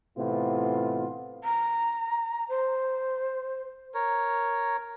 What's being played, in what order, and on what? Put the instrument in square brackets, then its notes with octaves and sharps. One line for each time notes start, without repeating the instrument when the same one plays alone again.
[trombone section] A2 C3 E3 B3 F4
[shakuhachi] A#5
C5
[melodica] A#4 C#5